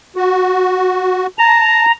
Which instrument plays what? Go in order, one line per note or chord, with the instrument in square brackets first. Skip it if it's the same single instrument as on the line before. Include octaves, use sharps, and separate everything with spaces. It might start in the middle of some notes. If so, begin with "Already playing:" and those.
[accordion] F#4
[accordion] A5 [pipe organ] A#5